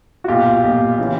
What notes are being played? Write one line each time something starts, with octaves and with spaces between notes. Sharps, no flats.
F#4
B1 A#2 F4 G4
B1 A#2
C#3 E3